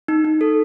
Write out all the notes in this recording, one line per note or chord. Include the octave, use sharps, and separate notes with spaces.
D#4
D#4
A4